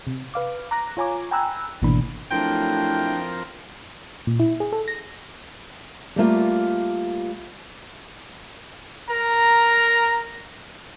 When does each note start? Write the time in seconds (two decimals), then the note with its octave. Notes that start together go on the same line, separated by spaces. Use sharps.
0.07 C3
0.34 B4 F5 D6
0.71 A#5 D6 F#6 A#6
0.97 F4 C#5 G#5 A#5 D6
1.31 G5 G#5 A#5 B5 E6 F#6
1.82 G#1 B2 E3 A#3 D4 B5
2.31 F3 F#3 A3 C4 D4 E4 A#4 G5
4.27 A#2
4.40 E4
4.60 G#4
4.73 A4
4.88 A#6
6.16 G3 A3 A#3 F4
9.09 A#4 A#5